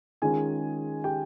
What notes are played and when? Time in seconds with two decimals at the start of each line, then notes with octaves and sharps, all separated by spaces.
0.22 D#3 G#3 C#4 F4 G#4 G#5
1.04 G4 G5